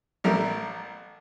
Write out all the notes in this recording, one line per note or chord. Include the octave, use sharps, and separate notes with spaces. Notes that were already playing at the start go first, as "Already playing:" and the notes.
A1 G3 A3 A#4